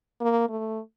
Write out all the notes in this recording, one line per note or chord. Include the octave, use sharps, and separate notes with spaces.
A#3
A3